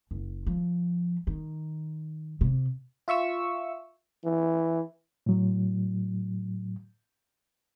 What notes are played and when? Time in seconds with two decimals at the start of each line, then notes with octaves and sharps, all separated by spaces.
0.11 F#1
0.47 F3
1.27 D#3
2.41 C3
3.08 F4 E5 C#6 E6
4.25 E3
5.26 A2 F#3